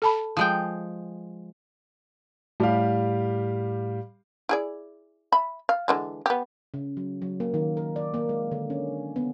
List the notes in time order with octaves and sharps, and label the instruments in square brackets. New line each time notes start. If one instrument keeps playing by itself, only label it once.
[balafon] A4 A5 B5
[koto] F3 G#3 G5
[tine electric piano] A2 [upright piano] G3 G4 F5
[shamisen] E4 G#4 D5
E5 B5
F5
D3 E3 G#3
B3 G4
[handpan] C#3
F#3
F#3
A#3
D#3
A#4
D5
A#3
G#3
D3
C#4
B3